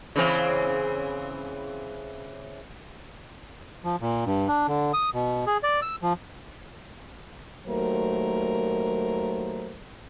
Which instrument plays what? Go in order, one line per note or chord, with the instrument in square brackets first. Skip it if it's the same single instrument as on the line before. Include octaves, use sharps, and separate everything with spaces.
[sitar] C#3 E3 C4
[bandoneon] F3
A#2
G2
D4
D3
D#6
B2
G#4
D5
E6
F3
[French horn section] D#2 F#3 A3 A#4 C5